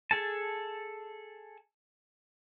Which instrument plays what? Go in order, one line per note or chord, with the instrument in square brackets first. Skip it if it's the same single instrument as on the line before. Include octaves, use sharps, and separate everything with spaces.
[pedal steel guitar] G#4 A4 A5